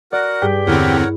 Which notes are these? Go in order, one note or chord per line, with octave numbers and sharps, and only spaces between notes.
F#4 A#4 D5 F#5
G2 G4 G#4
E2 D3 C4 E4 A#4 C#5 F#5